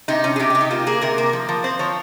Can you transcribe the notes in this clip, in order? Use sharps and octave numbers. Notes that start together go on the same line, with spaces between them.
C3 D#4
C#4
G#4
C3 G4
C3 G4
D#4
A#3 F4
A#3 G#4
C3 A#4
A#3
F3
F3
C4 C5
F3 C#5